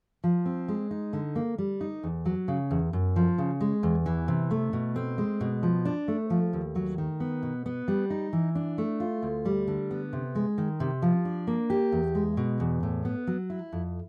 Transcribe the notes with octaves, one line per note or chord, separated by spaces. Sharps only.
F3
C4
G#3
D#4
D3
A#3
G3
D#4
E2
F#3
C#3
E2
F#2
F3
C#3
G#3
E2
E3
C3
A3
B2
C4
G#3
B2
F3
D4
A3
F3
D#2
F#3
D#3
B3
B2
B3
G3
D#4
E3
D4
A3
F4
D2
G3
D3
B3
C3
G#3
D#3
C3
F3
D4
A#3
G4
E2
G#3
B2
E2
A2
B3
F#3
E4
F2